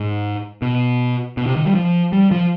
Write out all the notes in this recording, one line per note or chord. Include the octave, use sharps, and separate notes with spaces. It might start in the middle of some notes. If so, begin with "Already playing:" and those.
Already playing: G#2
B2
B2
C3
D#3
G3
F3
G3
F3